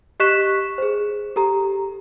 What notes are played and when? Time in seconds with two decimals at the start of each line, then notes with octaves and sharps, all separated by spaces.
0.20 G4 D#5 C#6 F#6 B6 E7
0.78 G#4 C5
1.36 G4 A4 A#5